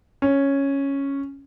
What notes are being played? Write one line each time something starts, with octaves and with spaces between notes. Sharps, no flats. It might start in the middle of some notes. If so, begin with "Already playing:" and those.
C#4